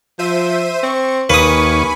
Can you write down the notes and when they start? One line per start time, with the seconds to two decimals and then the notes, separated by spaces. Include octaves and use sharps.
0.19 F3 C5 E5 D#7
0.83 C4 C#6
1.30 D#2 A#3 B4 G#5 B5 C#6 D#6